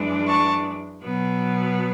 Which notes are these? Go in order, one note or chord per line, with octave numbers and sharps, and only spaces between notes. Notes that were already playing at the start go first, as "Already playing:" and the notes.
Already playing: F#2 E3 G#3 D4
A5 C#6
B2 F#3 B3